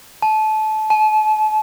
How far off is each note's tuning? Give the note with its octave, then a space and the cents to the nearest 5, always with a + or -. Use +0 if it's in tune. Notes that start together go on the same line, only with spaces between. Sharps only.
A5 -25
A5 -40